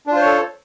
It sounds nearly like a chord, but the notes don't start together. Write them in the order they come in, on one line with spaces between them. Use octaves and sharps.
D4 F4 C5 C#5 A4